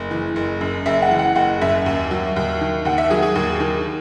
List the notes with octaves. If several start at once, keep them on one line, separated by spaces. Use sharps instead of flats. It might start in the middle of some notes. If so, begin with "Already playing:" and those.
Already playing: F#1
E3
F#1
F#2
F#1 E5
F#5
E3
F#5
F#1 F#5
F#2 E5
D#2
F#3
D#2
D#3
D#2 F#5
E5
F#3 G#4
G#4
D#2
D#3